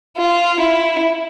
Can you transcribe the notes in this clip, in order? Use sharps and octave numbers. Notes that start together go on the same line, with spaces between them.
F4
E4